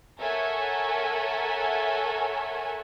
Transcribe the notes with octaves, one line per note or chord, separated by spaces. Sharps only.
A4 A#4 C#5 E5 F#5 G#5